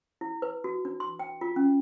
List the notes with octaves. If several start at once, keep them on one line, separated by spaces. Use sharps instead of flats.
E4
B4
F#4
D4
C6
G5
F4
C#4